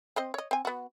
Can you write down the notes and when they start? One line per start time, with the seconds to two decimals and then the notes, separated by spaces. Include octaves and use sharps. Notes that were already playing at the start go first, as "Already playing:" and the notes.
0.16 C4 C5 D#5
0.34 C#5 D#5
0.51 C4 G#5
0.65 B3 F#4